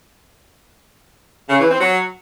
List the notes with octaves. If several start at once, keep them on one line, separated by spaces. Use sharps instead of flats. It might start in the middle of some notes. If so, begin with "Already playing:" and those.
C#3
E3
C4
F#3